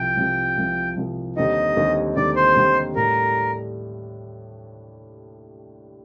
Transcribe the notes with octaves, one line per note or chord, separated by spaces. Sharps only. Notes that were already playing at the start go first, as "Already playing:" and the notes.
Already playing: C2 C3 F3 G5
C2 C3 F3
C2 C3 F3
C2 C3 F3
D#2 D3 G3 C4 D#4 D#5
D#2 D3 G3 C4 D#4
D#2 D3 G3 C4 D#4 D5
C5
D#2 D3 G3 C4 D#4
A2 G3 D4 A4 A#4